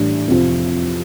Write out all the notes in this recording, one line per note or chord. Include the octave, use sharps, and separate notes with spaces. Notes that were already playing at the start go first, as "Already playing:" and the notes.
Already playing: A2 E3 G3 D4
F2 C3 F3